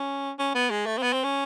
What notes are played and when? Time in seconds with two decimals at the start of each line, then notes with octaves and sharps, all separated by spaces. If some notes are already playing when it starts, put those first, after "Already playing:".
Already playing: C#4
0.39 C#4
0.55 B3
0.70 G#3
0.86 A3
0.98 C4
1.03 B3
1.13 C4
1.24 C#4